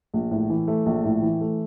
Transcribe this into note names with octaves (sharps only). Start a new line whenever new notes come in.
A#1
A2
E3
A3
A#1
A2
E3
A3